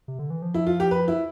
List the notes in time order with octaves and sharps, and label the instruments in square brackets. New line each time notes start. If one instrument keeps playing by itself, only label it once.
[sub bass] C3
D3
E3
F3
[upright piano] E4
F4
G4
B4
E4